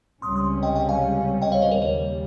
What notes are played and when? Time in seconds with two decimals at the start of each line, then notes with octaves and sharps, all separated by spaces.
0.22 C#2 C3 G3 C#4 C6 D#6
0.36 C6 D#6
0.63 D#5 G5
0.75 D#5 G5
0.89 F5 G#5
1.42 D#5 G5
1.52 C#5 F5
1.62 C5 D#5
1.71 A#4 C#5
1.82 D#2 C#3 G3 A#3 A#4 C#5